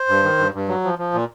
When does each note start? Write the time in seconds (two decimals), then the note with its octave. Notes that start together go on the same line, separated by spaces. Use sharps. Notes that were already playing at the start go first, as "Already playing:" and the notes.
Already playing: C5
0.09 G2
0.24 D#3
0.38 G2
0.54 G2
0.68 F#3
0.84 F3
0.99 F3
1.14 A#2